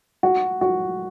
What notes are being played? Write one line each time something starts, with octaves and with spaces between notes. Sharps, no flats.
F#4
F#4